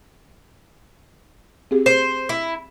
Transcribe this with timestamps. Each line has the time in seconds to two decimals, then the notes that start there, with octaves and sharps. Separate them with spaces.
1.71 C4 G4 G#4
1.86 C5
2.29 E4